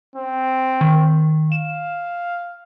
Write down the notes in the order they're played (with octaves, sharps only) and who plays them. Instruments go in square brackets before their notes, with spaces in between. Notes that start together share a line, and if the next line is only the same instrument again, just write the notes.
[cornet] C4
[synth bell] D#3
[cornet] F5 [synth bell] E7